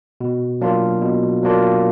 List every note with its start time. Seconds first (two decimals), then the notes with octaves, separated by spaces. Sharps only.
0.21 B2
0.61 F#3 A#3 D4 F4
1.02 B2
1.43 F#3 A#3 D4 F4